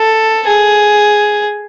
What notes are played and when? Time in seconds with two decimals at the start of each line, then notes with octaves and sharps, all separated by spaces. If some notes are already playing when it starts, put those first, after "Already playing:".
Already playing: A4
0.47 G#4